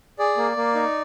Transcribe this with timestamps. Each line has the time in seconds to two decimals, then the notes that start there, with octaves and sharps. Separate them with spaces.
0.19 G#4 D5
0.37 A#3
0.57 A#3
0.75 D#4